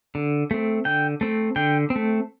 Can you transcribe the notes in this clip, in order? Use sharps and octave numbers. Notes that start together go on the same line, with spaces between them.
D3
A3 C4
D3 G5
A3 C4
D3 G5
C4
A3